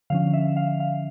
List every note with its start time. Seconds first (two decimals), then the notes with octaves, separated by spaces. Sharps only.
0.10 D3 F3 C#4 F5
0.34 E5
0.57 F5
0.80 F5